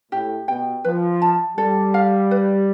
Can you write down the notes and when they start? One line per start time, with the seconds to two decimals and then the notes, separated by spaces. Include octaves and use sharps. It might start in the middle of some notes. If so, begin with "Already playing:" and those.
0.11 A2 G4
0.48 B2 G5
0.84 F3 B4
1.22 A5
1.57 G3 A4
1.94 F5
2.31 B4